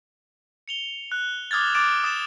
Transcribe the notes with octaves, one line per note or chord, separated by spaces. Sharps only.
C#7 F7 G7
F#6
D6 D#6 F6 G#6 A6
D6 A6 D7 E7
D#6 A6 E7